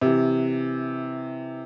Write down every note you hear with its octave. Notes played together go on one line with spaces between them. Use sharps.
C3 E3